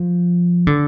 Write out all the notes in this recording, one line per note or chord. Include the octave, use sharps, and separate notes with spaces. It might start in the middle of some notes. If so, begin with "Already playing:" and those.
Already playing: F3
D3